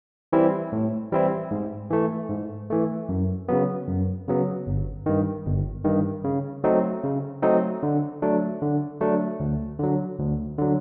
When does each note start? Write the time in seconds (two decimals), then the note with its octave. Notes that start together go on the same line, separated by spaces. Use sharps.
0.33 E3 G3 C4 E4
0.73 A2
1.12 E3 G3 C4 E4
1.51 G#2
1.91 E3 A3
2.30 G#2
2.70 E3 A3
3.09 F#2
3.49 C#3 F#3 B3
3.88 F#2
4.28 C#3 F#3 B3
4.67 G1
5.06 G2 D#3
5.46 G1
5.85 G2 D#3
6.24 C#3
6.64 F#3 A3 C4 D#4
7.04 C#3
7.42 F#3 A3 C4 D#4
7.83 D3
8.22 F#3 A3 D4
8.62 D3
9.01 F#3 A3 D4
9.40 D2
9.79 D3 F#3
10.19 D2
10.58 D3 F#3